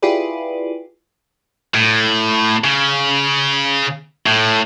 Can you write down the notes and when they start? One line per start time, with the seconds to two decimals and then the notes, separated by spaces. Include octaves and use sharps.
0.02 E4 F4 G4 G#4 B4 D5
1.74 A2
2.64 C#3
4.26 A2